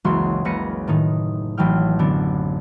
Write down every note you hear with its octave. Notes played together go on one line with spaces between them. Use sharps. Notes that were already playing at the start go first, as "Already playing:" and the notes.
F#1 C#2 E3 A#3 F#4 C6
C#2 A#3 B4 A#6 C#7 D#7
A2 D#3 D#4
A1 E3 F#3 D#4 G5 F6
F#2 D3 B3 C4 D4